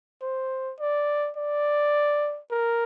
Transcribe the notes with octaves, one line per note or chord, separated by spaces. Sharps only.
C5
D5
D5
A#4